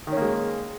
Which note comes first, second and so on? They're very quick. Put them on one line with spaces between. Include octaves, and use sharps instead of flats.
D#3 C#4 A#3 G#3